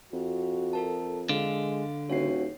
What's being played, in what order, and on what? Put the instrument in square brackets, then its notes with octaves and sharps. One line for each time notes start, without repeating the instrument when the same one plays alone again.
[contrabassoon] F2 [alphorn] F#4
[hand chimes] A4 A#4 A5
[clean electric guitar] D3 [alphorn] G#3 [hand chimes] F5
[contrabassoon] D#1 [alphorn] F#4 [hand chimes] C#5 C7